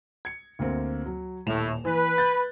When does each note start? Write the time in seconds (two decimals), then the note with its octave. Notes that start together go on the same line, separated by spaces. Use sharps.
0.25 G#6 C#7
0.59 D2 A#3 C4
1.06 F#3
1.47 D#1 A2 E7 F7
1.85 E3 B4
2.18 G6 A6